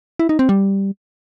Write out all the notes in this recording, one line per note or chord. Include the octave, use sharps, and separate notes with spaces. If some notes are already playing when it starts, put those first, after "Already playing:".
E4
D#4
C4
G3